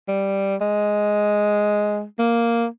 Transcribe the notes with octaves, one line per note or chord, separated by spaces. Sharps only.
G3
G#3
A#3